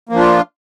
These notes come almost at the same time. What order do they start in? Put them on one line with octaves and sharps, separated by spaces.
A#3 F3 D4 F4